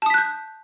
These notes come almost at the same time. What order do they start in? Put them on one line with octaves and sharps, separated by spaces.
A5 D#6 B6 F#6 G6